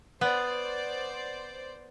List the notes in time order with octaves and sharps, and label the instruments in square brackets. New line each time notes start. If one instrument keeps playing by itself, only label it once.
[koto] B3 [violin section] C5 D5